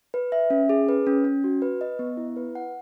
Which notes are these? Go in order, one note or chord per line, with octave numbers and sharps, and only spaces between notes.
B4
E5
C#4
G#4
B4
C#4
C#4
F#4
B4
D#5
B3
E4
B4
F#5